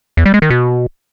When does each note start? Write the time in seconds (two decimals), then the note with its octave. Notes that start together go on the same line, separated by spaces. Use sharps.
0.17 E2
0.26 G3
0.34 G#3
0.42 D#3
0.50 B2